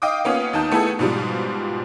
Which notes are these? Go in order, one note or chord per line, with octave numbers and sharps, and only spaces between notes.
D#5 F5 G5 D6 D#6
A#3 B3 C#4 F4
D#2 D#4 A5 G6
A3 B3 E4 G#4 A4
G#2 B2 F3 G3